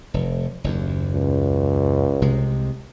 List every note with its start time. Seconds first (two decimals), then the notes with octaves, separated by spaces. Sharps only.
0.14 F1
0.64 F#1 D#2
1.13 C#2
2.22 C2 C3 G#3